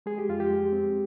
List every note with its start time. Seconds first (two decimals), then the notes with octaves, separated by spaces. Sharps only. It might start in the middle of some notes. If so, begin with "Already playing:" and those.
0.06 G#3 G#4
0.18 G4
0.29 F2 F4
0.40 G4
0.50 G#3
0.72 C4